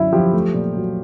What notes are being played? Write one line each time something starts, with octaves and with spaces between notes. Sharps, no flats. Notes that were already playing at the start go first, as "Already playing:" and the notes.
Already playing: F#2 D3 C#4 E4
F3 G4
A3
A#2
F#3